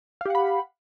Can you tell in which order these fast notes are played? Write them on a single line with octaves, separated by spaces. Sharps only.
F5 G4 F#5 B5